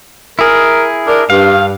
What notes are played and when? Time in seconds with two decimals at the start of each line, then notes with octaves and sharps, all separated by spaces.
0.39 E4 G#4 A#4
1.07 D4 A#4
1.30 G2 F5